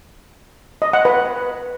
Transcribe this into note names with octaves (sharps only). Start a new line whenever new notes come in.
D#5
F#5
B4